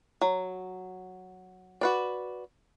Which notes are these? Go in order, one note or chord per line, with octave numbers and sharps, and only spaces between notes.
F#3
F#4 B4 D5